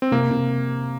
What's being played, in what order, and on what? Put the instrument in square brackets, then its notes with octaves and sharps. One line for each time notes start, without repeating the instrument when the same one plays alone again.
[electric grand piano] C4
[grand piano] C3 [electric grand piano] A#3
[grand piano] C3